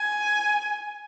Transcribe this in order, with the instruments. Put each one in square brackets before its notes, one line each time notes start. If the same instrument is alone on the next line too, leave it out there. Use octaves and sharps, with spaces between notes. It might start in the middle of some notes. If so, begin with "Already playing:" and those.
Already playing: [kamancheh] G#5